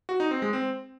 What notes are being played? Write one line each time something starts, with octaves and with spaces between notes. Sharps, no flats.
F#4
D#4
C4
G#3
C4